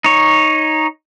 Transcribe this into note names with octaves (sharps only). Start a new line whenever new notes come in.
D#4 C#5